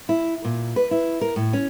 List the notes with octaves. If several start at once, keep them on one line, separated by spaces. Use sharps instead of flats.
E4
A#2
B4
E4
A#4
A2
C#4